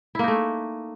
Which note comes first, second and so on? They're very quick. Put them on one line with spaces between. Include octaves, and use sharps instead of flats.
E4 A#3 D#4 A3